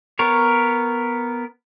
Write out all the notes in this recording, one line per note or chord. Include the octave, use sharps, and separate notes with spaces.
B3 A#4 C#5